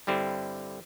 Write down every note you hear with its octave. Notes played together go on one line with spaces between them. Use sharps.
G2 D3 G3 C4 E4